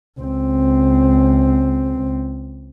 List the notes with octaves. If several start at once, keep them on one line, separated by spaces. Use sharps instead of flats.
C#2 C4